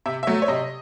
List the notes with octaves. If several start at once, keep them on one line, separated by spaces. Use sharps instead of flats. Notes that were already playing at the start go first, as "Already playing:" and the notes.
C3 E5
F#3 A3 E5
C#5
C3 D#5